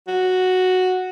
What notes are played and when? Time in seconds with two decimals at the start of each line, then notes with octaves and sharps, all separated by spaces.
0.08 F#4